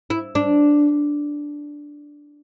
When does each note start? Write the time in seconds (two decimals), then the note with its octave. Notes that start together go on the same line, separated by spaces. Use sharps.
0.10 E4
0.35 D4